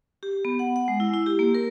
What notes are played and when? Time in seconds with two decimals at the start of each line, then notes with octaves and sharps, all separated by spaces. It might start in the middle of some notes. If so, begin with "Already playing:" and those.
0.23 G4
0.45 B3
0.59 F#5
0.76 F#5
0.88 G#3
1.00 E4
1.14 E4
1.26 G4
1.39 A#3
1.55 A#4